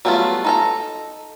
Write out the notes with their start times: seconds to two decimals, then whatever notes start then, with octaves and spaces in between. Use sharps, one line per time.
0.05 F#3 G3 A3 B3 F4
0.45 D#4 A4 A#5